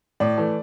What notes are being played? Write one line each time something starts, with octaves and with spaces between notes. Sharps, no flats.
A2 D5
E3 A3